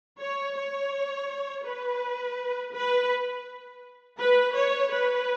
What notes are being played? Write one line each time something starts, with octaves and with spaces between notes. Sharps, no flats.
C#5
C#5
B4
B4
B4
C#5
B4